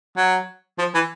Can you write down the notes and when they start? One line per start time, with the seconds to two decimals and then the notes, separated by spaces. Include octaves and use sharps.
0.17 F#3
0.78 F3
0.94 E3